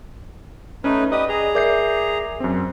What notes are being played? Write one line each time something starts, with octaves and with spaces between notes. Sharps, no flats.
A3 C#4 D#4 B4
G4 B4 D5 D#5 D#6
G#4 A#5
A#4 D5 E5 D6 G6 C7
F#2 C4